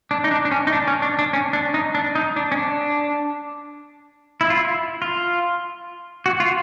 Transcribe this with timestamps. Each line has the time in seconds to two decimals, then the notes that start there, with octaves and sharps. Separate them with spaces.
0.11 D4
0.24 D#4
0.31 D4
0.45 D4
0.51 C#4
0.67 D#4
0.73 D4
0.88 C#4
1.02 D4
1.19 D4
1.33 C#4
1.53 D4
1.74 D#4
1.95 D4
2.15 D#4
2.36 D4
2.52 C#4
2.56 D4
4.41 E4
4.50 F4
4.59 E4
5.02 F4
6.26 F#4
6.40 F4